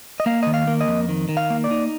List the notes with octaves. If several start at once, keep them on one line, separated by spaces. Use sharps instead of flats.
D#5
A#3 F5
D#3 D#5
F5
A#3
D#5
F2
D#3
D#3
F5
A#3
D5
D#4